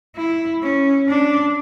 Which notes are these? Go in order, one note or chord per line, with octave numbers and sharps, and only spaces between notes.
E4
C#4
D4